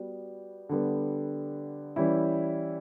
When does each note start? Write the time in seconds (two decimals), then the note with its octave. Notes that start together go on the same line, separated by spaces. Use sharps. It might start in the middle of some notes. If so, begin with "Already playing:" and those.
Already playing: G3 B3 F#4
0.69 D3 G3 B3
1.96 E3 G3 C#4 E4